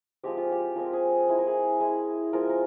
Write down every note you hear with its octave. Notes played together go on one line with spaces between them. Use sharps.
F3 G#3 C4 G4
F4
G4
F3 G#3 C4 A#4
G#4
G#3 E4 G#4
A#4
G#4
G#3 E4
F3 G#3 C4 F4 A#4
A#4